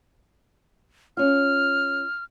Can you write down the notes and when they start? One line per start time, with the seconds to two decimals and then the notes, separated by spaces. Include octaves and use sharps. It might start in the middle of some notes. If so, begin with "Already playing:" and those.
1.17 C#4 F4 F6